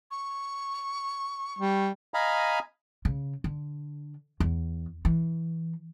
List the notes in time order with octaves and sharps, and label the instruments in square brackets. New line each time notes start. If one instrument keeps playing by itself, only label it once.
[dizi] C#6
[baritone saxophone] G3
[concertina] D#5 F5 G#5 A#5 B5
[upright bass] C#3
D3
E2
E3